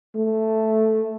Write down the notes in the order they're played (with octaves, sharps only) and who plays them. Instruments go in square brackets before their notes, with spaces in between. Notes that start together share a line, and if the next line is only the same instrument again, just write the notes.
[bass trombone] A3